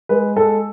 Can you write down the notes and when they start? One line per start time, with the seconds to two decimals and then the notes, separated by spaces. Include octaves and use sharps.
0.09 G#3 B4
0.36 G#3 A4